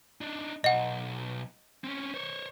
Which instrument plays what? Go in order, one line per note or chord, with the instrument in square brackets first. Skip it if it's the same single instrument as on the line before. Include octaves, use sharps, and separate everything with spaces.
[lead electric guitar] D4 D#4
[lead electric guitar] B1 [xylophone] D#5 F#5
[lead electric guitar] C4 C#4
C5 C#5